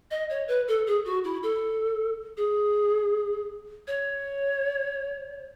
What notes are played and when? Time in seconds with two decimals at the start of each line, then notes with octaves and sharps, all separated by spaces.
0.11 D#5
0.30 C#5
0.48 B4
0.68 A4
0.87 G#4
1.05 F#4
1.24 E4
1.43 A4
2.37 G#4
3.87 C#5